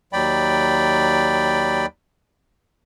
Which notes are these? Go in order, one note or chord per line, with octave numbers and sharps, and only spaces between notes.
D#2 F#3 D5 G5 B5